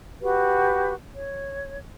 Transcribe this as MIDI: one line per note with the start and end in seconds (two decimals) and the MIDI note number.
0.21 0.93 66
0.21 0.93 67
0.21 0.93 71
1.15 1.79 73